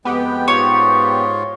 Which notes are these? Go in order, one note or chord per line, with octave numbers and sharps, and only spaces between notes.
F2 G#3 B3 G4 G5
G#2 F4 C#5